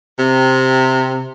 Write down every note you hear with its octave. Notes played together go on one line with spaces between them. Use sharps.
C3